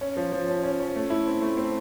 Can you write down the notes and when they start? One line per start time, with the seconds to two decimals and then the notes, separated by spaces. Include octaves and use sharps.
0.01 C#4
0.17 F3
0.32 F3
0.48 C#4
0.63 C#4
0.80 C#4
0.96 A3
1.10 E4
1.27 C4
1.42 A3
1.57 C4